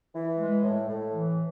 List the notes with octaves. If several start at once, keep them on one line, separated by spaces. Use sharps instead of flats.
E3
G#3
A2
A2
E3